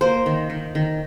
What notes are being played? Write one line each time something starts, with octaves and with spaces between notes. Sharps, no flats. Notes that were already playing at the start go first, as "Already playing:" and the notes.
A#3 C5
D#3
D#3
D#3